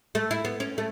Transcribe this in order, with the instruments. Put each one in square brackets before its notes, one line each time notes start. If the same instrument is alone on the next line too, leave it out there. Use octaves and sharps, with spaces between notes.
[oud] A3
E4
B3
C#4
A3